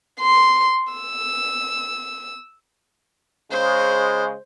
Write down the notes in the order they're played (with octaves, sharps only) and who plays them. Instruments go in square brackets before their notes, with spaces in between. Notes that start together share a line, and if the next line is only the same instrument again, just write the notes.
[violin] C6
E6
[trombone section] C#3 G#3 [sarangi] C5